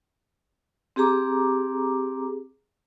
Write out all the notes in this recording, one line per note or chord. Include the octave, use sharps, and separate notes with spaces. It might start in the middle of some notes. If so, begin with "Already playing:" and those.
C4 G4 G#4 A#5 D6